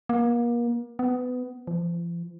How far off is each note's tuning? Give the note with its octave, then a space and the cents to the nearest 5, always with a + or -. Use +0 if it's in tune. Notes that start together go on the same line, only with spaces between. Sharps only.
A#3 +35
B3 +20
F3 -40